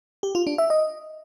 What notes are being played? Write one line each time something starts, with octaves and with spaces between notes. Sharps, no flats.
G4
F4
D4
E5
D#5